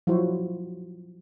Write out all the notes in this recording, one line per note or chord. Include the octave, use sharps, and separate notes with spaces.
F3 F#3 E4 F#4 C5